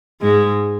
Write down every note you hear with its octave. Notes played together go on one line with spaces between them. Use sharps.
G#2 G#3